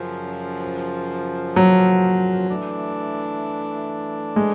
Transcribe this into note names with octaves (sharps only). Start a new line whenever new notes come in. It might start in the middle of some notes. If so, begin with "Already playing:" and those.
Already playing: F#2 C#3 F3
F#3
E3 A3 D4
G#3